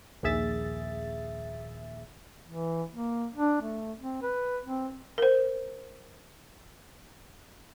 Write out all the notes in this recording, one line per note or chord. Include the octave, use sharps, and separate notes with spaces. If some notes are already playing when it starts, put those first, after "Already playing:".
A#1 D#2 G#4 E5 A6
E3
A#3
D4
A3
C4
B4
C4
A#4 C5